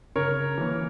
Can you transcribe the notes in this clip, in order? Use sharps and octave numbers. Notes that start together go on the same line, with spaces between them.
C#3 A#4 C#5
E3 A#3 C#4